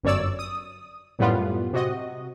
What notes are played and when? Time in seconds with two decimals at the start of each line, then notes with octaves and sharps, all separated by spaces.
0.03 G1 F#2 C#5 D5 E6
0.39 D#6
1.19 F#2 A2 G3 B3 F4
1.73 C3 F#4 D#5